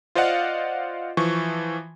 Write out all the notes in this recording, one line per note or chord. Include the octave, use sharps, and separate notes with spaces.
F4 C5 D5 D#5 F5 F#5
E3 F3 C#6